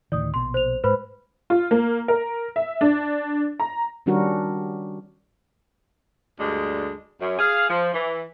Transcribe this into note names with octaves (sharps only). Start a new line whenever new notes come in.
D2 A2 D#3 D5 D#6
A#1 B2 C6
C5 F7
G#2 B4 C5 B5
F4
A#3
A#4
E5
D4
A#5
D#3 G3 C#4 D4 F#4 A#4
D2 G2 D3 G#3 D4
F#2
G#4 F5
F3
E3